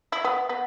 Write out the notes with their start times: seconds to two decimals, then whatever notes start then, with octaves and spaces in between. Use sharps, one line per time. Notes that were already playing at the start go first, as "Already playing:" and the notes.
0.12 E4
0.24 B3
0.49 B3